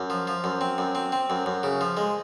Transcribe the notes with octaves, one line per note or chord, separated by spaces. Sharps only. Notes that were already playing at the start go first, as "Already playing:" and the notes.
Already playing: F#2
F3
F3
F#2
C4
F#2
C4
C4
F#2
F#2
C#3
F3
G#3